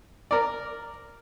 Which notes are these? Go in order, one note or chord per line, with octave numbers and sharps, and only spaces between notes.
A#4 D5